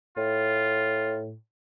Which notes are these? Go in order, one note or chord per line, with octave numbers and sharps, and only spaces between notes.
A2 F4